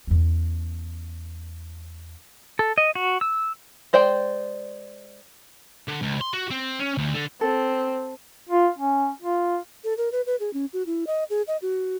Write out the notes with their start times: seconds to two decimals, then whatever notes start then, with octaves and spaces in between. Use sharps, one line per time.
0.07 E2 C#4
2.59 A4
2.78 D#5
2.95 F#4
3.21 E6
3.93 G#3 C5 D5 G5
5.88 D3
6.02 C#2
6.21 C6
6.33 F#4
6.50 C4
6.80 C#4
6.98 D2
7.14 D3
7.41 C4 A4
8.49 F4
8.78 C#4
9.22 F4
9.84 A4
9.97 A#4
10.12 B4
10.26 B4
10.40 G#4
10.53 C#4
10.73 F#4
10.86 E4
11.07 D#5
11.30 G#4
11.48 D#5
11.62 F#4